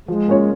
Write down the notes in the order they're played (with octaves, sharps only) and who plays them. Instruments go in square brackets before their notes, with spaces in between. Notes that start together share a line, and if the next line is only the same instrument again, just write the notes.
[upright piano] F3 [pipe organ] G#3
[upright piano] A#3 C#4 F4 C#5